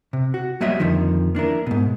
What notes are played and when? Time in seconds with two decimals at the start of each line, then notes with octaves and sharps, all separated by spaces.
0.13 C3
0.34 F#4
0.61 F#3 G3 A#3 D#5 E5
0.80 F2 D3 D#3 F3
1.35 A#3 D4 E4 A#4
1.66 G#2 B2